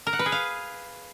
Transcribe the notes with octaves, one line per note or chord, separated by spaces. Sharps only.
A#4
F#5
B4
G#4
F5